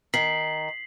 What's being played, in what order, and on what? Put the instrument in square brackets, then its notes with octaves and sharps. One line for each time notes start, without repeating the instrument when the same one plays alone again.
[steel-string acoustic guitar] D#3 [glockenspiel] B6 C7 F#7